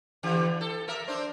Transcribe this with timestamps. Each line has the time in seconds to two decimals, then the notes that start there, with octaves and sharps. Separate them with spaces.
0.23 D3 E3 G4
0.61 A4
0.88 A#4 E5
1.08 D4 C5